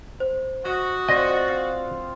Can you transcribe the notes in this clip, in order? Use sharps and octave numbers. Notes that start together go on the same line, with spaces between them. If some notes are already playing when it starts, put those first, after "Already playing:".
C5
F#4 D#5
C4 F4 D5 D#5
F5